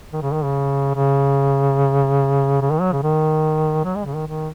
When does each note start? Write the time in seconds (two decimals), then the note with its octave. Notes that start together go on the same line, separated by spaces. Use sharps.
0.13 D#3
0.22 C#3
0.32 D#3
0.44 C#3
0.95 C#3
2.61 C#3
2.71 D#3
2.81 F#3
2.93 C#3
3.03 D#3
3.84 F#3
3.95 G#3
4.06 C#3
4.16 D#3
4.27 D#3